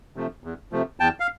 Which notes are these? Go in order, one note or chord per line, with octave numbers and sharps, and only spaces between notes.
C3 F3 A3
E2
C3 F3 A3
E2 G5 A5
F5